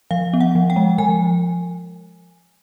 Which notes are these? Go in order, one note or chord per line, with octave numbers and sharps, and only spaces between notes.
F3 F5
B3
F#5
F3
G5
G#3
F3 G#5